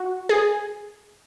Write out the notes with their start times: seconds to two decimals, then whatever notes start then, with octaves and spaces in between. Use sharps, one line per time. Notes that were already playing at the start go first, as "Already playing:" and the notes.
Already playing: F#4
0.29 G#4